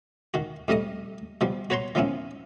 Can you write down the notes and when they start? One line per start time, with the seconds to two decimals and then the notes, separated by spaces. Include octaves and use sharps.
0.34 D#3 F#4
0.68 F2 G3 A3 D#5 D#6
1.41 B2 F3 G3
1.70 F#4 B4 C#5 A#5 C6
1.95 D#3 F3 B3 C#4 E4